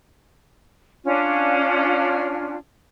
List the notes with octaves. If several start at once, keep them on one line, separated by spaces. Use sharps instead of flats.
C#4 D4 F4